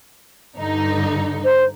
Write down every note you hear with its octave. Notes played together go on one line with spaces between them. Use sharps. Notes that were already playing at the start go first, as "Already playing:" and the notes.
G2 D3 D#4
C5